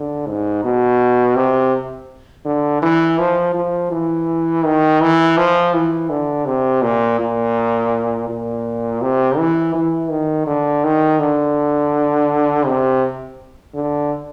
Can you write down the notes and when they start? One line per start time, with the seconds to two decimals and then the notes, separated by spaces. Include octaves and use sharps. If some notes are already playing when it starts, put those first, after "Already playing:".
Already playing: D3
0.27 G#2
0.64 B2
1.36 C3
2.45 D3
2.82 E3
3.19 F3
3.55 F3
3.91 E3
4.65 D#3
5.01 E3
5.37 F3
5.73 E3
6.09 D3
6.46 C3
6.82 A#2
7.19 A#2
8.28 A#2
9.01 C3
9.38 E3
9.74 E3
10.10 D#3
10.47 D3
10.84 D#3
11.19 D3
12.66 C3
13.74 D3